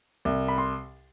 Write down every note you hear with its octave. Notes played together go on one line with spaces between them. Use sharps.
C2
B5
C6